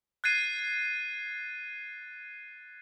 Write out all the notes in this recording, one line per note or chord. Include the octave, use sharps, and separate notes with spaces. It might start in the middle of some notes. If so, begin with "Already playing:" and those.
F#6 G#6 A6 C7 D#7